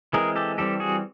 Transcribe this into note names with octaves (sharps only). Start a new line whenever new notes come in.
E3 G#3 C4 G#4 A#4
G4 A4
E3 G3 C4 G4 A4
F#4 G#4